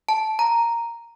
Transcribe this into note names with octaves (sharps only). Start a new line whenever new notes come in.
A5
A#5